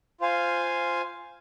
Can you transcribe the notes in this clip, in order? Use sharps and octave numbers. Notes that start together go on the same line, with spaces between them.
F4 C5 F5 G#5